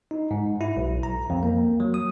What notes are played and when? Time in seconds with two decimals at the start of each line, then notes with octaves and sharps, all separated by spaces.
0.11 D#4
0.31 G#2
0.61 E4
0.77 B1
1.03 A#5
1.30 F2
1.43 A#3
1.80 F#3
1.94 D#6